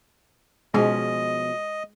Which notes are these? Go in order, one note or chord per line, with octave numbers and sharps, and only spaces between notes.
B2 F3 G#3 C#4 D#5